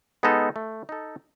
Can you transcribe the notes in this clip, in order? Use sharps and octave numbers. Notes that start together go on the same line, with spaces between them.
G#3 B3 D#4 A4
A3
D#4 A4